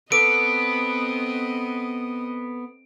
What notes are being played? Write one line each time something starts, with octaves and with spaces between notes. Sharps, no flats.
B3 C4 A4 B4 D#5 D6 D7